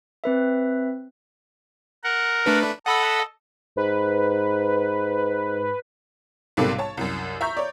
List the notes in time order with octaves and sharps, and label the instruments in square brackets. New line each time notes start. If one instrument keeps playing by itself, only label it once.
[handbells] C4 B4 E5
[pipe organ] A#4 F#5
[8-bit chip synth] A3 D4 B4
[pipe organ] A4 D#5 [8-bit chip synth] F#5 B5 E6
[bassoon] G#2 [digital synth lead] B4
[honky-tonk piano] B1 G#2 C3 G3 A#3 A4
C#5 A5
C2 F#2
E5 A#5 C#6 G6
C#5 D5